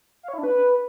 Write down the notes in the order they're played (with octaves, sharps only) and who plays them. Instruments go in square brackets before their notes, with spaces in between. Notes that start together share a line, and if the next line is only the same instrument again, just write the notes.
[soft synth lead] F5
C#5
E4
D4
B4